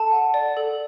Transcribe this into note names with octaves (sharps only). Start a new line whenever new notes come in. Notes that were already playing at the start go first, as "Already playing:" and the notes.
Already playing: A4 A5
F#5
D5
A4